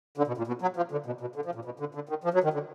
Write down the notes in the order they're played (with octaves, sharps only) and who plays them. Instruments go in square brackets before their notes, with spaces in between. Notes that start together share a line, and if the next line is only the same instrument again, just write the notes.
[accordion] D3
B2
A#2
B2
F#3
F3
D3
B2
B2
D3
F3
A#2
B2
D3
D3
D#3
F3
F#3
D#3
D3